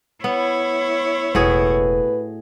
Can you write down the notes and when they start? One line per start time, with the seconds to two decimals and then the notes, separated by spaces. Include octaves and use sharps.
0.24 B3 E4 C#5
1.35 E1 A2 F#4 G#4 B4